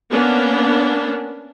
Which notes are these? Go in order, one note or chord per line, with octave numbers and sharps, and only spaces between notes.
A#3 B3 C#4 D4